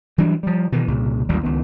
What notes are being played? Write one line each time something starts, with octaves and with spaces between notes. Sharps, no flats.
E3 F#3 G3 D4
F3 G3
B2 D#3 E3
C2 A#2 C#3
A1 D#2 F#3 G3
C#2 D#3 B3